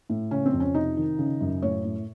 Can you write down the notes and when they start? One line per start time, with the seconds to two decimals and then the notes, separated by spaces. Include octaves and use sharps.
0.10 A2
0.31 C#3 C#4
0.46 C4
0.53 F2
0.60 C#4
0.74 C3 D#4
0.97 D#3
1.19 C#3
1.41 F#2
1.62 A2 C#5
1.85 A2